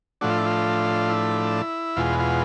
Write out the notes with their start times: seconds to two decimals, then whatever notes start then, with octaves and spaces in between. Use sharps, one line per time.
0.21 A2 F3 A3 D4 F#4
0.30 F4
0.38 E4
0.46 F4
1.09 E4
1.96 E2 B2 G#3 F4
2.19 F4